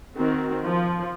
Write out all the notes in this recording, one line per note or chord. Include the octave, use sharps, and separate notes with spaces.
D#3 C4 F#4
F3